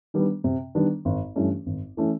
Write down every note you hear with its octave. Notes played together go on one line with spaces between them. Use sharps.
D#3 G3 B3 D4
C3
D#3 G3 B3 D4
G#1
G2 E3 A3 C#4
G#1
E3 A3 C#4